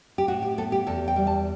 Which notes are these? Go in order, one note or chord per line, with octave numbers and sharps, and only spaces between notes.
G4
A2 F#4
G4
B3 A4
G4
E2 A4
G5
G3
A5